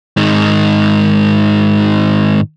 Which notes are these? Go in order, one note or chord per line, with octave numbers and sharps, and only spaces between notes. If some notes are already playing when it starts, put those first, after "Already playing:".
G#2 D#3